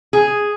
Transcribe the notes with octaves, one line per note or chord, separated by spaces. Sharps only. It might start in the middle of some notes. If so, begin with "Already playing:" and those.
G#4